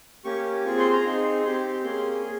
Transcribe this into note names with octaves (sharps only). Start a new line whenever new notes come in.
A#3 C#4 G4 C#6
C4 F4 G#4 C#6
C6
A#5
C4 D#4 G#4 C6
C4 G4 C6
A#3 C#4 G#4 C6
G#4